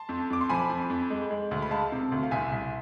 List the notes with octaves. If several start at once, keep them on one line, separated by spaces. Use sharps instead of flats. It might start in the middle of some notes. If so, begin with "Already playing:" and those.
Already playing: A5 C6
F2
F2 D6
C6
F3 G#5 B5
F2
F2
G#3
G#3
D2
B5
G#3 F5 A5
C3
D2
F5
C2 E5 G#5
C2